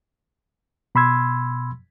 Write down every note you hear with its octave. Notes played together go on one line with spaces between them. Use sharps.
B2 B5 C6 E6 G#6